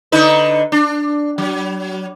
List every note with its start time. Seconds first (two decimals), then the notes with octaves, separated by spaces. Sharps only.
0.12 D3 D#4 B4
0.72 D4
1.38 F#3